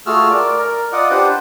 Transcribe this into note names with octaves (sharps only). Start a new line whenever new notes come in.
A3 F4 F#4 G#4 E6 F6
A#4 D5
A#4
F4 D5 D#5 F#5
D4 G4 B4 C5 F#5